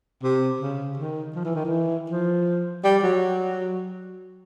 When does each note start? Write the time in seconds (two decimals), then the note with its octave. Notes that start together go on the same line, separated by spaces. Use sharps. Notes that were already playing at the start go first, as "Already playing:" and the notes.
0.24 C3
0.60 C#3
0.98 D#3
1.35 F3
1.45 E3
1.55 D#3
1.65 E3
2.10 F3
2.84 G3
3.03 F#3